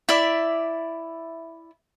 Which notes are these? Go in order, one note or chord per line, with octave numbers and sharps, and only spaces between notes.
E4 D5 E5